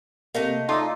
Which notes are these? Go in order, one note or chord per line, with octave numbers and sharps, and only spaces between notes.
C3 A3 A#3 D#5 F5
D#4 F4 A4 D5 E5